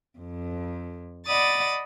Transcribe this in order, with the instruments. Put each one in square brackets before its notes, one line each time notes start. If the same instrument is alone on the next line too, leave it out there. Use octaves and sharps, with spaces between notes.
[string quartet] F2
D5 D#5 F#5 B5 D#6 A6